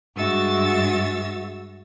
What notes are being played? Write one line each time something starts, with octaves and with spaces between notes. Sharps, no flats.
G2 G#3 F#4 E5 E6 A6